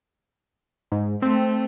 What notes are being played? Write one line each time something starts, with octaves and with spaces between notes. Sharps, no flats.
G#2
A3 C4